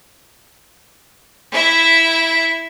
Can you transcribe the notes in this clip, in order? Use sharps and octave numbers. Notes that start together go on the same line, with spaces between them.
E4 E5